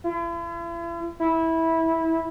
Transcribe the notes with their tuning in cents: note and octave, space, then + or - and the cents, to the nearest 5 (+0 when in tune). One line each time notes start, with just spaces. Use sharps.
E4 +45
E4 -15